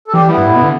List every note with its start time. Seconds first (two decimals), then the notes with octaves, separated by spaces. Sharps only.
0.08 A4
0.13 E3 D4 G4
0.28 G3 B3 E4
0.37 G2
0.46 A2
0.55 B2
0.63 D3